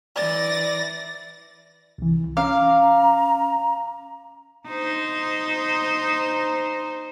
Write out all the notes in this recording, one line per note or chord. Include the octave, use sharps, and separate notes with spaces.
E3 D5 A6 A#6
C2 E3
C#4 F5 A#5 D6
D#4 C5